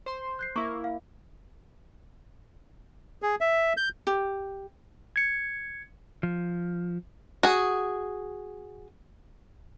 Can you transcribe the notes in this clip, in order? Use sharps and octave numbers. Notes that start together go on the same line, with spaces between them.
C5 C6
F#6 G6 C7
A#3 E4 C#6 D6
F5
G#4
E5
G6
G4
G#6 C#7
F3
F#4 G#4